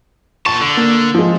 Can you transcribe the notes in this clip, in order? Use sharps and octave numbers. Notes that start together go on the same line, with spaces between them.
A#2 A5 C#6
D3
A#3
F3 G#3